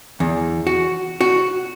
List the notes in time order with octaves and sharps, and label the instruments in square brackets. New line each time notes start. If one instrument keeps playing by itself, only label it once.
[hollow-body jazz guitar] E2
F#4
F#4